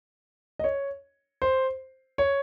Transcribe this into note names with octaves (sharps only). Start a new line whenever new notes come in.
D#5
C#5
C5
C#5